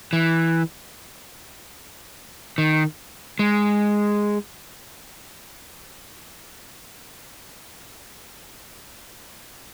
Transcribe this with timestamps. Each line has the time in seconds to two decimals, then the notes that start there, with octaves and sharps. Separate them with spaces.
0.13 E3
2.58 D#3
3.39 G#3